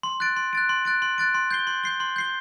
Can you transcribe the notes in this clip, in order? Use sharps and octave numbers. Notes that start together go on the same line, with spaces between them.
C6
F#6 A6 D7
C6
F#6 A6 D7
C6
F#6 A6 D7
C6
F#6 A6 D7
C6
G6 C7 G7
C6
G6 C7 G7
C6
G6 C7 G7